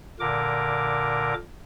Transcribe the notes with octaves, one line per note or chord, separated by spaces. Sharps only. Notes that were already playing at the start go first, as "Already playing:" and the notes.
A#2 D3 A#4 D6